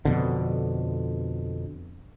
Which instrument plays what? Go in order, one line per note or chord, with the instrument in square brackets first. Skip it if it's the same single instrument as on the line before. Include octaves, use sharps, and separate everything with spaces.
[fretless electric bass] F2 B2 D3